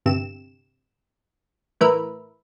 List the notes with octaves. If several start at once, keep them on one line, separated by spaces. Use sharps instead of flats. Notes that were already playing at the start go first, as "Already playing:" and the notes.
G1 C3 E7
A2 E3 A#4 B4 E5